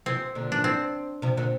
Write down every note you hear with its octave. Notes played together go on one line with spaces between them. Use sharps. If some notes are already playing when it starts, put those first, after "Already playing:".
C3 F3 C4
A#2 D3
D4
C4
C3 F3
A#2 D3